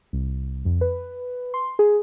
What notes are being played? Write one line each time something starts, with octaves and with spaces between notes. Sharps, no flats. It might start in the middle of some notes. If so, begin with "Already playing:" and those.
C2
F2
B4
C6
G#4